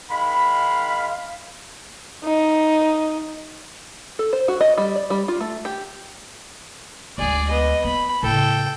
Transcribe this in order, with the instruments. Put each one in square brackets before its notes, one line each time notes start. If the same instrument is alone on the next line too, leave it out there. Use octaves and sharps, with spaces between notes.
[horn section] D#3 G#3 B5 [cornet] F5
[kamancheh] D#4
[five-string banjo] A4
C5
F#4
D#5
G3
D5
G3
F4
A3
G4
[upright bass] D2 G#3 [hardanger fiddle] G#4 D5
[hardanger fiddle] B3 D#5
[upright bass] B3 [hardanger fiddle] B5
[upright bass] A2 C#3 [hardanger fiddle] A4 G5